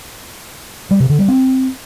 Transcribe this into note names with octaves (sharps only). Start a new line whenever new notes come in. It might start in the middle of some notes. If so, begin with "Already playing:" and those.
G3
C3
D3
G3
C4